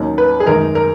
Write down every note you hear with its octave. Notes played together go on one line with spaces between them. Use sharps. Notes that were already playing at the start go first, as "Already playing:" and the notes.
Already playing: D#2 D#3 F#3 C#4
B4
G#4
F#2 D#3 G#3 A#4
A#4